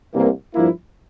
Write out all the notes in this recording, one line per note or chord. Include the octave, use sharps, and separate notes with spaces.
C2 C3 E3 A#3
G2 F3 A#3 E4